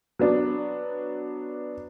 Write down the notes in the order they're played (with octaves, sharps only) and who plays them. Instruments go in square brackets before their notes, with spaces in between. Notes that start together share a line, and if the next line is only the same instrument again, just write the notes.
[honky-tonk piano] F#3 B3 D4